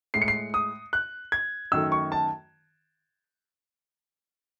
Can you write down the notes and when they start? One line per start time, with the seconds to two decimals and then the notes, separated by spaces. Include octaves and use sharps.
0.14 A2 G#3 C7
0.22 C#7
0.28 C7
0.54 D#6
0.93 F#6
1.32 G#6
1.72 F#2 D#3 F#3 A3 E6
1.92 C#6
2.12 A5